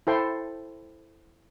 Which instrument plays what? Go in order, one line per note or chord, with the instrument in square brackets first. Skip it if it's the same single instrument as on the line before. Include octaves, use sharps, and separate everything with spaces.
[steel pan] E4 A4 C5 G5 C6